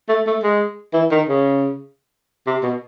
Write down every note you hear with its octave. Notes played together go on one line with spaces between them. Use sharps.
A3
A3
G#3
E3
D#3
C#3
C3
B2